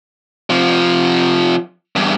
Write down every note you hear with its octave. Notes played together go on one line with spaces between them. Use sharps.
C3 F3
E2 G2